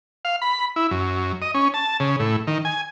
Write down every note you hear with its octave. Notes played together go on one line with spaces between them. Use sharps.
F5
B5
E4
F#2
D#5
C#4
A5
C#3
A2
D#3
G#5